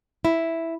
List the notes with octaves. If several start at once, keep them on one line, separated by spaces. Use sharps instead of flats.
E4